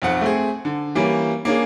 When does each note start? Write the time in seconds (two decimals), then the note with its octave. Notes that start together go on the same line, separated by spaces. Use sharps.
0.02 B1 F2 F#5
0.21 A3 C4 G#4
0.65 D3
0.95 E3 G3 A#3 C#4
1.45 A#3 C#4 D4 G#4